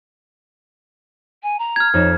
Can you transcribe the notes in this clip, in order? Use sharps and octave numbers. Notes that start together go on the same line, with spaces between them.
G#5
A#5
F6 G#6
F2 D#4 C#5 E7